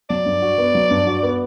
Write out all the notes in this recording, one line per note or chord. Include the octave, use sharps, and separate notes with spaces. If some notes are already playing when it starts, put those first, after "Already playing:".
F#3 D5
G2
F#4
B3
F#3
G2
F#4
B3